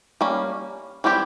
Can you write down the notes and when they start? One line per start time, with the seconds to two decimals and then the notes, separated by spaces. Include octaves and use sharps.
0.21 G3 A#3 C#4
1.04 E3 G3 C4 E4 G4